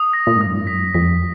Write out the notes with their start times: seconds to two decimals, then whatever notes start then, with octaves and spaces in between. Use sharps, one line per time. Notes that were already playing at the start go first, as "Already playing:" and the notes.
Already playing: D#6
0.13 A#6
0.27 A#2
0.37 G#2 D#6
0.46 F#2
0.56 G#2
0.67 F#2 B6
0.94 F2 B6